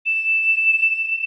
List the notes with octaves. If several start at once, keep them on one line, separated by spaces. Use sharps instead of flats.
E7